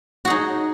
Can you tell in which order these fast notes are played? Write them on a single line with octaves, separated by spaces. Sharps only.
F#4 G#4 D#4